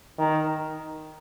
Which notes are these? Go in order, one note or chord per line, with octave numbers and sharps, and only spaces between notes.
D#3